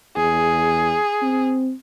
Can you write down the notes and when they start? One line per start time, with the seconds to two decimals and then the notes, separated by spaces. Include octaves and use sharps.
0.17 E2 G#4
1.22 C4